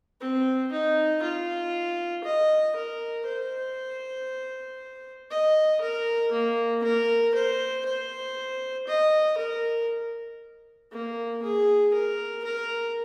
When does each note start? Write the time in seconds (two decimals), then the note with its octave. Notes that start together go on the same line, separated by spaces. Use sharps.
0.21 C4
0.71 D#4
1.22 F4
2.24 D#5
2.75 A#4
3.26 C5
5.30 D#5
5.81 A#4
6.32 A#3
6.83 A#4
7.34 C5
7.85 C5
8.88 D#5
9.38 A#4
10.91 A#3
11.42 G#4
11.93 A#4
12.45 A#4